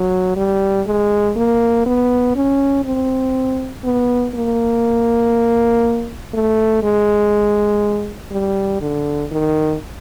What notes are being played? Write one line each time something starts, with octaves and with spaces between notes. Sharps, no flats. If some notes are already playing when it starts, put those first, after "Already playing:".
Already playing: F#3
G3
G#3
A#3
B3
C#4
C4
B3
A#3
A3
G#3
G3
D3
D#3